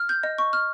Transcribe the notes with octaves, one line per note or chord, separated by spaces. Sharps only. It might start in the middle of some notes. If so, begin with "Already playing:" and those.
Already playing: F6
G6
D#5
C#6
F6